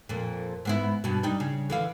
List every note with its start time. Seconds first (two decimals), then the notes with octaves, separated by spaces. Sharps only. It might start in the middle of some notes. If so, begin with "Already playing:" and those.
0.09 F2 A#2
0.65 G#2 B3 E4
1.04 G2 B2
1.23 G3 D#4
1.40 C#3
1.70 D3 E3 F5